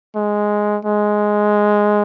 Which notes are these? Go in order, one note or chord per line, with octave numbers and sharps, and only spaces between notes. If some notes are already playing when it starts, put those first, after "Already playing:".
G#3
G#3